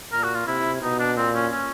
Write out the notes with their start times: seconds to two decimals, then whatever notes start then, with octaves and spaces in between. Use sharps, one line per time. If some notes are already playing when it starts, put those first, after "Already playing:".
0.12 A#2 A#4
0.24 F#4
0.35 F4
0.46 C3 E4
0.82 B2 D#4
1.00 D4
1.17 A#2 C4
1.35 C#4
1.52 C#4